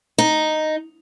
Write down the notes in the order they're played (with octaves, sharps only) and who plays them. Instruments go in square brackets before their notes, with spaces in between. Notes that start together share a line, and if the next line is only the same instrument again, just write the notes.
[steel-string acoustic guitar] D#4